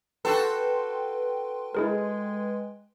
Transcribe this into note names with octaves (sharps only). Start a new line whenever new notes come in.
F#4 A4 B4 G5 C6
G#3 E4 G#4 A#4